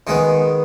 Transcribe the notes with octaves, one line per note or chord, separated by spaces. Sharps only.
D#3 G#3 B3